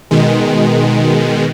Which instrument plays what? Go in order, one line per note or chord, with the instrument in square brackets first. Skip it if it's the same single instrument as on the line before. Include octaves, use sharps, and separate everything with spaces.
[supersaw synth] B2 D#3 G#3